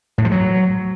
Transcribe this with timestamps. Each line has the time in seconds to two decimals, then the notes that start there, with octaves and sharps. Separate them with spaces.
0.18 A2
0.25 F3
0.32 F#3